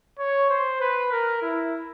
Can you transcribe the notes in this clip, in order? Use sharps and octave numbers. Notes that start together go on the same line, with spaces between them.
C#5
C5
B4
A#4
E4